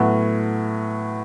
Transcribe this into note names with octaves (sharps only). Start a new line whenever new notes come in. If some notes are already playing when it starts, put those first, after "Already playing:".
Already playing: A2 F#3 B3